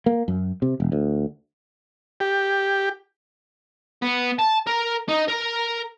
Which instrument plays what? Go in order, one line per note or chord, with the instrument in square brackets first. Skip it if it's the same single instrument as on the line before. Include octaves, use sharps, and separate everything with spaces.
[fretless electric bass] A#3
F#2
C3
E1
D2
[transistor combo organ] G4
[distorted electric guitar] B3
A5
A#4
D#4
A#4